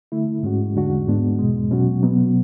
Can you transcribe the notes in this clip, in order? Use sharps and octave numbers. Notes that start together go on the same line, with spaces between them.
D3 A3 E4
G#2 G#3 C#4 F#4
E2 D3 G#3 D4 F#4
G#2 G#3 B3 D4
E2 B2 G#3
B2 F#3 C#4 F#4
B2 F#3 B3